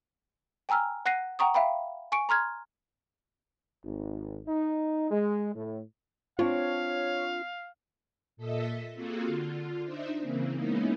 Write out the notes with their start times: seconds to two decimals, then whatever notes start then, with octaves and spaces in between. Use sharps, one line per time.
0.69 G5 G#5 A#5 E6 F6
1.06 F#5 F#6 A#6 C7 D#7
1.39 F#5 G5 A#5 C#6 D#6
1.54 E5 F5 G5 B5
2.12 G#5 C#6 C#7 D7
2.29 A#5 C6 F6 G#6
3.85 G#1
4.47 D#4
5.11 G#3
5.55 A2
6.39 C4 D4 F4 C#5 F5
8.37 A#2 A4 D#5 E5 B6
8.94 A#3 C4 F4 F#4 G#4 A4
9.26 D3 F4
9.85 D4 D#4 C5 E5
10.19 C#3 E3 A#3 C4
10.54 G#3 A#3 B3 C#4 D#4 E4